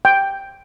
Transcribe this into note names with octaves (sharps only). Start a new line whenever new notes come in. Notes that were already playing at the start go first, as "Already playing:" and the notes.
G5